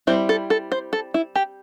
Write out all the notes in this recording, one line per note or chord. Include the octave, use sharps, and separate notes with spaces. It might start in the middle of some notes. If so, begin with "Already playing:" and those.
G3 C4 E4 C5
A4
A4
C5
A4
E4
G4